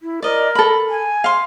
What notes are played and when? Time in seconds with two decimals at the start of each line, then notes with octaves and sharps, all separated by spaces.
0.01 E4
0.22 A#4 D5 D#5
0.55 A4 B5
0.90 G#5
1.24 F5 C6